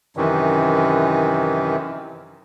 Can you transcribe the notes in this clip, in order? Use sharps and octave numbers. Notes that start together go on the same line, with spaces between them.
F#2 C3 D#3 E3